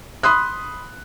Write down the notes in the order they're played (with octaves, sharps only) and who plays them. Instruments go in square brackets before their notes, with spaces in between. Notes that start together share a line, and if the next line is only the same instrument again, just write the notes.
[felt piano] B5 C6 D#6 F#6